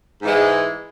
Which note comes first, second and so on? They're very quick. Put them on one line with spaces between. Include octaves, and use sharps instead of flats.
G#2 E3 G#3